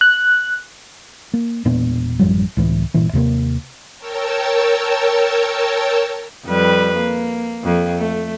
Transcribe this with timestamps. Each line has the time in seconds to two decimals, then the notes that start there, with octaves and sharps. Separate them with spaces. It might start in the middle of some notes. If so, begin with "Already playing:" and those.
0.01 F#6
1.34 A#3
1.65 E1 A#2 B3 D4
2.19 A1 F#2 F3 G3
2.57 C#2 A2 E3
2.94 G1 A#2 E3
3.13 D#2 C3 G3 A#3
3.98 A#4 C#5 G5 A5 E6
6.46 F2 G3 B4
6.95 A#3
7.64 F2
7.98 A3